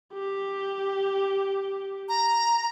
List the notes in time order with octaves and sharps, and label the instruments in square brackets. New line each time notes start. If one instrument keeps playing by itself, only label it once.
[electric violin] G4
[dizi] A#5